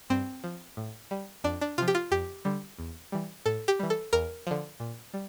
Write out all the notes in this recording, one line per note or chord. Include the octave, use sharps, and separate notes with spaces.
G2 C4
F3
A2
G3
F2 D4
D4
C3 F3 F4
G4
F4
F2 G4
D3 G3
E2
E3 G3
A2 A4
G4
E3 G3
A4
E2 A#4
D3 F3
A#2
G3